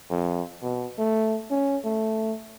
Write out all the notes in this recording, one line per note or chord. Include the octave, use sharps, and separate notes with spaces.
F2
B2
A3
C#4
A3